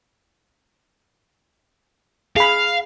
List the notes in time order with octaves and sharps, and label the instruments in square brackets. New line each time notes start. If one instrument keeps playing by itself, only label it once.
[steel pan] G#4 B5 [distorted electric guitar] F5